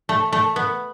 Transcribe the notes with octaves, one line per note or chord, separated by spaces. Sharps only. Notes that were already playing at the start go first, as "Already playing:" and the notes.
A3
A3
B3